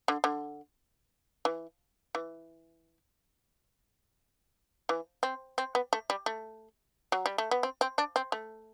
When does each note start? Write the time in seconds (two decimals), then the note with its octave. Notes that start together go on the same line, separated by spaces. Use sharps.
0.08 D3
0.24 D3
1.45 E3
2.15 E3
4.89 E3
5.23 C4
5.58 C4
5.75 B3
5.93 A3
6.10 G3
6.26 A3
7.12 F#3
7.26 G3
7.38 A3
7.51 B3
7.63 C4
7.81 C4
7.98 D4
8.16 C4
8.32 A3